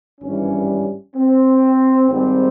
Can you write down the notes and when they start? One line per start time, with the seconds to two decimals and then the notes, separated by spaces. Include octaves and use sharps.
0.21 G#1 G2 E3 G3 C#4
1.15 C4
2.09 G#1 G#2 G3 C4